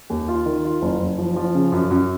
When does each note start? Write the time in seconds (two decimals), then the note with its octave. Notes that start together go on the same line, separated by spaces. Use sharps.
0.10 D#2
0.28 F4
0.46 D#3
0.64 F4
0.82 F#1
1.00 F#1
1.18 F3
1.36 F3
1.55 C#3
1.72 F#2
1.90 F#2